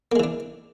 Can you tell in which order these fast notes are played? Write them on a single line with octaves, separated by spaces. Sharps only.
A#3 G#3 E3 D4